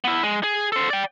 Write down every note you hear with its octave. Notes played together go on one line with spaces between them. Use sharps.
B3 E4
G#3
G#4
A4 C5
D5 G5